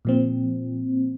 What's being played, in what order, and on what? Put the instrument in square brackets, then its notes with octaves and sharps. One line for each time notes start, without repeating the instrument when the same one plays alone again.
[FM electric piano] A#2 F3 C4